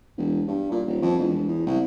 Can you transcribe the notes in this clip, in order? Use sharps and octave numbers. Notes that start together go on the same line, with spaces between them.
E1
G2
A#2
D#1
F2
E1
E2
C2